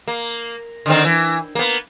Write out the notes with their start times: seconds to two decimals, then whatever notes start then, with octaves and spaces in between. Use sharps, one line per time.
0.08 A#3
0.86 D3 D#3 C4
1.05 E3
1.55 A#3 B3